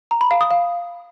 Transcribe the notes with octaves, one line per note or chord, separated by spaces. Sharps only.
A#5
B5
F5
D#6
F5